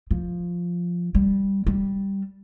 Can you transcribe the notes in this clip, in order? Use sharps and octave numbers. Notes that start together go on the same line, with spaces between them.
F3
G3
G3